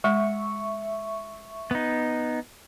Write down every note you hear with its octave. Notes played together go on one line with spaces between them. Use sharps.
G#3 E5 C#6
B3 D#4